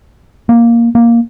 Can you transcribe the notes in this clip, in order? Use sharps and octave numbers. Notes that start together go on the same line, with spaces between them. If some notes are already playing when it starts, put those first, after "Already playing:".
A#3
A#3